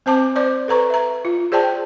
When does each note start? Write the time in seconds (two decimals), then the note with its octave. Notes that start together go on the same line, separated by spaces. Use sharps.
0.06 C4 C5 A5 D6
0.36 C5 D5 D6
0.68 A4 B4 A#5 C#6
0.90 E5 A#5
1.25 F4
1.52 G#4 C5 D5 G5 A5